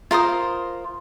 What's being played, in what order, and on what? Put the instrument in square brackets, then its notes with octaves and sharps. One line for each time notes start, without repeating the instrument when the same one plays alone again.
[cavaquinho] F4 A#4 C5 D#6